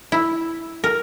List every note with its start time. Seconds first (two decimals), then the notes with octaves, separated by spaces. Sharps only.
0.12 E4
0.84 A#4